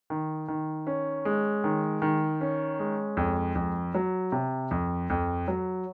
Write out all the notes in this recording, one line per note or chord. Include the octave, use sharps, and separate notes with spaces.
D#3
D#3
C#4
G#3
D#3
D#3
C#4
G#3
F2
F2
F#3
C3
F2
F2
F#3